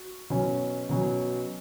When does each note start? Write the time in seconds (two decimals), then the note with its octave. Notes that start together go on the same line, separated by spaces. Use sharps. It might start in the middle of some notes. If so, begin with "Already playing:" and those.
Already playing: F#4
0.30 B2 F#3 C#4
0.89 B2 F#3 C#4